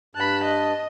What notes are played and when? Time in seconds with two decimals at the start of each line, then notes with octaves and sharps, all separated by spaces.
0.15 G2 A5 B5 F#6
0.44 D#5